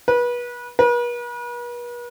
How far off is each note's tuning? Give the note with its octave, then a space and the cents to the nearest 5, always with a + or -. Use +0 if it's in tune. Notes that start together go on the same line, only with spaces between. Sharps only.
B4 -30
B4 -45